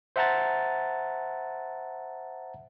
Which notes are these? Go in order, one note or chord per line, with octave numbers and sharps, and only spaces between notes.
C5 E5 F#5 A5 A#5 A6